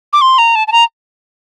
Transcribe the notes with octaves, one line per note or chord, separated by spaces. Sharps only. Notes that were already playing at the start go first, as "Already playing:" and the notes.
D6
C6
A#5
A5
A5
A#5